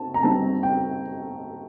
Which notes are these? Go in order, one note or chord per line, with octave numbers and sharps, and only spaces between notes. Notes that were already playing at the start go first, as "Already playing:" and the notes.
Already playing: C4 D#4 A5
A#5
D3 G3 C4 D#4 A5
G5